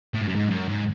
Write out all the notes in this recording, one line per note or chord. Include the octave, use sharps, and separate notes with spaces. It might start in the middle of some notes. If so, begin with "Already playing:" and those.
A2
G#2
F#2
G#2
F#2
G#2